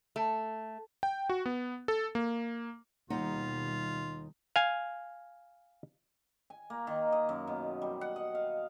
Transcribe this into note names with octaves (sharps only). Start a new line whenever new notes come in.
A3
G5
F#4
B3
A4
A#3
D#2 B2 D#3 G3 D#4 F4 F#5
F5 G#5
G#5
A#3
D#3
D#5
F#2
B2
G3
F#5
D#5
F5